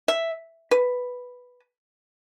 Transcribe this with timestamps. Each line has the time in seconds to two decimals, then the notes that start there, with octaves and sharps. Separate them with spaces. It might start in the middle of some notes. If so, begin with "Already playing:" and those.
0.08 E5
0.71 B4